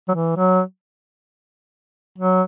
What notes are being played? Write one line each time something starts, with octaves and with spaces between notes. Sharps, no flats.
F#3
E3
F#3
F#3